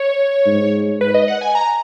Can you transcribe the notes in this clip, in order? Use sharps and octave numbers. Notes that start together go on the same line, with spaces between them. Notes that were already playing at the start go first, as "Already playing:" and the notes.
Already playing: C#5
G#2
B4
D#5
F#5
G#5
A#5